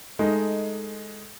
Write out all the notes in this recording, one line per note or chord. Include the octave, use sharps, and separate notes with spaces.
G#3 A3 D#4